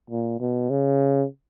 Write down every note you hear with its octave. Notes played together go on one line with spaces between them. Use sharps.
A#2
B2
C#3